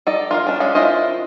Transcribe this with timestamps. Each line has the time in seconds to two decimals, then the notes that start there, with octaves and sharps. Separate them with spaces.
0.07 D#4 A4 D5
0.31 F4 A#4 F5
0.47 C#4 D4
0.60 G#3 C#4 D5 F5
0.75 D#3 E4 F4 C5 D#5